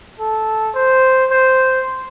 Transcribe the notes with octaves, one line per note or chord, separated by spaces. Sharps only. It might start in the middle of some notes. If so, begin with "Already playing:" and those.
A4
C5
C5